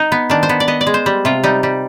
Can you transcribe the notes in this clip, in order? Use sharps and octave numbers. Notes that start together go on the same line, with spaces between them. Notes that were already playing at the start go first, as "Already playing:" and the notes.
Already playing: D#4
B3
D#3 D4
C5
B3
D5
B3 D#5
D5
G#3
C5
G3
C3 F4
G3 D#4
G3